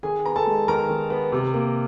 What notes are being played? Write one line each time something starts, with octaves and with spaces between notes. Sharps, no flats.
D#3 G#4 G#5
B3 A#5
A4 A5
G#3
D#3 A#4 A#5
D#3
B3
C3
A#3